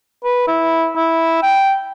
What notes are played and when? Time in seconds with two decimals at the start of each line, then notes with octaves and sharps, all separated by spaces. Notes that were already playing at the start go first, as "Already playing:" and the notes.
0.24 B4
0.47 E4
0.96 E4
1.43 G5